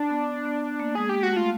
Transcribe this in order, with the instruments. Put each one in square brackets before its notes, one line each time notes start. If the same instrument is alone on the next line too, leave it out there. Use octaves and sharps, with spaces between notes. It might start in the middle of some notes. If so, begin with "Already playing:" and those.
Already playing: [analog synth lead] D4
[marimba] B3
B3
A#3
[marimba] G#3 [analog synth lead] G#4
[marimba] G#3 [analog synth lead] G4
[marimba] G#3 [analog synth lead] F#4
[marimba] A3 [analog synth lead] F4